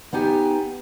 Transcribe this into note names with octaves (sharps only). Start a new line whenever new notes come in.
B3 D#4 G4 G#5